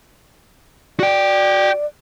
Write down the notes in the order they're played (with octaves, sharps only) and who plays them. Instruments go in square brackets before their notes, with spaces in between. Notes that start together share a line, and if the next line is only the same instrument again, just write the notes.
[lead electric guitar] F#4 G5 [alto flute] D5